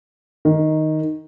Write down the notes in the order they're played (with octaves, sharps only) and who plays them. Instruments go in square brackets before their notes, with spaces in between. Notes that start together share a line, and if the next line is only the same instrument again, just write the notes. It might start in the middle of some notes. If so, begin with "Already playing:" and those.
[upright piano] D#3